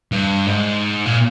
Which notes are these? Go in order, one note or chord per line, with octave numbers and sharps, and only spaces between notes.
G2
G#2
A#2